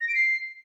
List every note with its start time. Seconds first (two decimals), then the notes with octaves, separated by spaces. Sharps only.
0.01 A#6
0.08 D7
0.15 C7